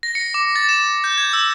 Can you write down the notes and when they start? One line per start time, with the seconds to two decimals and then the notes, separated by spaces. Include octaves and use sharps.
0.03 A#6
0.15 C#7
0.34 D6
0.56 A6
0.69 E7
1.04 G6
1.18 G#6
1.33 E6